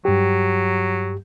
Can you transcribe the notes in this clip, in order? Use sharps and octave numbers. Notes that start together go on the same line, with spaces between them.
G2 F#3 G4